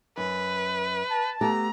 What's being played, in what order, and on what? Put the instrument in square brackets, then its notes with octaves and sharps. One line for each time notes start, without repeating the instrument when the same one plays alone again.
[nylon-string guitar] F#2 [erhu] B4
[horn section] A5
[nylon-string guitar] A3 B3 G4 [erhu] A#5